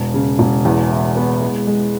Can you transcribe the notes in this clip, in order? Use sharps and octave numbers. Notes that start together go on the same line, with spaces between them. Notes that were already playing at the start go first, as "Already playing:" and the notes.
Already playing: E1
C#3
E1
E2
E4
B3
G#3
G#3